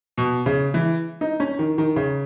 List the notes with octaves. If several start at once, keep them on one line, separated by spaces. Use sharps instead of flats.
B2
C#3
E3
D#4
C#4
D#3
D#3
C#3